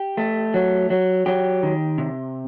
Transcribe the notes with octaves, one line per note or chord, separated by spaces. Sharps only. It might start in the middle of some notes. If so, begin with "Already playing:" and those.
Already playing: G4
A3
F#3
F#3
F#3 G4
D#3
C3